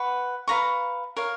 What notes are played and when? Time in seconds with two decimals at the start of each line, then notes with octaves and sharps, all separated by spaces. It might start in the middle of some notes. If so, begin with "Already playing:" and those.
Already playing: B4 F#5 C#6
0.48 B4 F5 A#5 C#6
1.17 A#4 C#5 F5